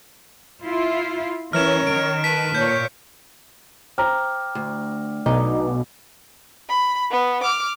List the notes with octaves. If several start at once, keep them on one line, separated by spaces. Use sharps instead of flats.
E4 F4
E3 C#4 A#4 C#5 F6 E7
D#3 D7
B4 A5 B6 D#7
A#2 C#5 G6
C5 G5 A#5 D6 F6
D2
B1 B2 D#4 D6
B5
B3
D6 F6